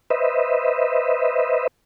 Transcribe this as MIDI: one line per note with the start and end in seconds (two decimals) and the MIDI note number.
0.10 1.67 71
0.10 1.67 72
0.10 1.67 75
0.10 1.67 76